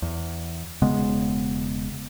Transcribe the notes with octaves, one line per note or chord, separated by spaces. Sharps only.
E2
E1 C#3 G#3 B3